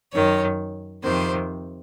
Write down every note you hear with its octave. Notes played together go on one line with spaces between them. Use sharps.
F#2 D#3 C#5
F2 C3 D#3 C5